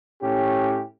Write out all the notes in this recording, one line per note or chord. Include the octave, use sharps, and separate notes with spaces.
A2 C#4 G4